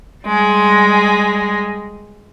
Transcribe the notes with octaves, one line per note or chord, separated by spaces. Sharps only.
G3 G#3